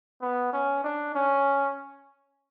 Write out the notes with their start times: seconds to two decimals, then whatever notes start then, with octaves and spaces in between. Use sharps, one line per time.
0.22 B3
0.53 C#4
0.84 D4
1.15 C#4